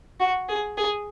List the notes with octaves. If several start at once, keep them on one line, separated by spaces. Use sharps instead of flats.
F#4
G#4
G#4